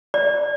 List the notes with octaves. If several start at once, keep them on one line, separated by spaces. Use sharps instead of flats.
D5